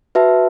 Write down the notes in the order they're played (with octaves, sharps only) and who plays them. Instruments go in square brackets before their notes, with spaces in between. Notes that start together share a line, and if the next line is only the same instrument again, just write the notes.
[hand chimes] F#4 B4 E5 A5